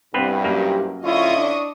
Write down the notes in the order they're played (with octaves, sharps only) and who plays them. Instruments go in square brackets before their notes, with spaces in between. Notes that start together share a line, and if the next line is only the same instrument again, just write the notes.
[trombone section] C2 G2 [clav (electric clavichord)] B3 C4 B4
[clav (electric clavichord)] F#2 A#3 [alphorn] G4
[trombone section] D3 C#4 E4 [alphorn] F4 [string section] D#5 C#6 D#6
[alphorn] D4